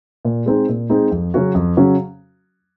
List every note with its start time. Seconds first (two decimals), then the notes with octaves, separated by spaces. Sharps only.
0.25 A#2
0.46 G#3 C4 D#4 G#4
0.69 A#2
0.90 G#3 C4 D#4 G#4
1.11 F2
1.34 C#3 F#3 C#4 F#4
1.55 F2
1.77 C#3 F#3 C#4 F#4